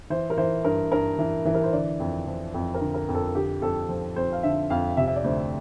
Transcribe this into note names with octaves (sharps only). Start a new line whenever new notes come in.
E3 C5
A#4
E3 C5
G2 A#4
G2 A#4
E3
E3
A#4
C5
D3 D5
F2
F3
F2
A#4
D3
A#4
F2
A4
D3 G4
F2 A4
F3
F2 C5
F5
D3 E5
F2 F5
C3 E5
E5
D5
D2 C5